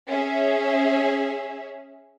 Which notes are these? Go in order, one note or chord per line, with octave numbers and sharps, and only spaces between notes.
C#4 G#4 E5